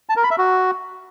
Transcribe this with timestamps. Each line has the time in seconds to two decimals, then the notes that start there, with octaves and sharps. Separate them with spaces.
0.09 A5
0.16 A#4
0.24 B5
0.31 E5
0.38 F#4